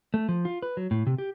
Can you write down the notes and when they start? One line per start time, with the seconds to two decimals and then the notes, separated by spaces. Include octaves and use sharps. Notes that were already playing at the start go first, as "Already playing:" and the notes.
0.14 A3
0.29 F3
0.45 F4
0.62 B4
0.77 F#3
0.91 A2
1.07 C3
1.18 G4